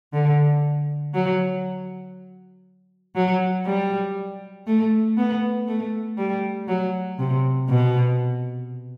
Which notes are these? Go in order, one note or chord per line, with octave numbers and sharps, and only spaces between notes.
D3
F#3
F#3
G3
A3
B3
A3
G3
F#3
C3
B2